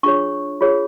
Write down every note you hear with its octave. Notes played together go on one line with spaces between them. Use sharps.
D4 F4 G#4 C#5 C#6
F4 G#4 C#5